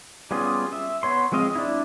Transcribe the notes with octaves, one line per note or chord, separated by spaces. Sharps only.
G3 B3 C#4 F4 G#4
E5
B3 C#5 C6
F3 G#3 C4 D#5 F5
D4 E4